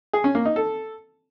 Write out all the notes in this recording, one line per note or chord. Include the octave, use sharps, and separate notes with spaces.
G#4
C#4
A#3
D#4
A4